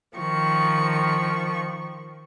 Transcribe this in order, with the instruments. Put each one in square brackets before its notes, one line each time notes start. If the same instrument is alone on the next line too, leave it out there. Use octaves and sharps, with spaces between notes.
[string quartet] D#3 F3 C#6